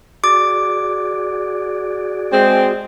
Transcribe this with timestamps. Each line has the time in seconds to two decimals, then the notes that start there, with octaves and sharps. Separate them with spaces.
0.24 F#4 G#4 D5 D6
2.32 G#3 C4